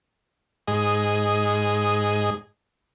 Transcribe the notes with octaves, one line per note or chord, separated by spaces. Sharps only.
G#2 G#4 D#5